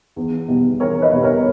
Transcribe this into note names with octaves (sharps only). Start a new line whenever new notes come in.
E2
B2 G3 B3
E2 A#4 C#5
B4 D#5
B2 G3 B3
A#4 C#5